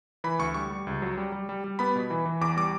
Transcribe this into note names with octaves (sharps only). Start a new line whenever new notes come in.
E3 B5
D2 C#6
G3 C#6
G3
C#2
F#3
G3
G3
G3
G3
B3 B5
B2
E3
E3
E2 D6
G3 D6